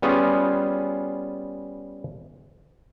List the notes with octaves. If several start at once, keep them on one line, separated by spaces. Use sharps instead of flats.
G3 B3 C#4 F4 G#4